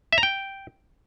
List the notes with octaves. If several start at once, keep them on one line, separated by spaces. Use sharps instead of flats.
E5
A#5
G5